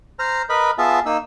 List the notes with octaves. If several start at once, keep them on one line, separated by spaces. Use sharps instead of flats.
C5 A#5 F6
A#4 B4 D#5 B5
B3 F4 G#4 E5 A5
A#3 D#4 E6